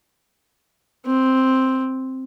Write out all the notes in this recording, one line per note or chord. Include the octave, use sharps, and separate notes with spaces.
C4